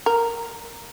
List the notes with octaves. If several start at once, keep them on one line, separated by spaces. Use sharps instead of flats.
A#4